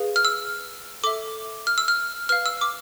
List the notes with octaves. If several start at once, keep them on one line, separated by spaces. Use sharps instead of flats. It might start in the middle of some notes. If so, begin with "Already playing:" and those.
Already playing: G#4 B4 F5
F6
E6
A4 E5 D6
F6
E6
F6
B4 F5 F6
E6
D6